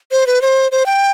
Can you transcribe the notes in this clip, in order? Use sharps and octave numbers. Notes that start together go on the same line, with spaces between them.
C5
B4
C5
C5
G5